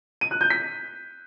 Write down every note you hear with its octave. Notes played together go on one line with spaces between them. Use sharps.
D#7
F#6
G6
B6